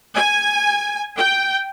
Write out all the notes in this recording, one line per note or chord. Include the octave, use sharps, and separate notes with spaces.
G#5
G5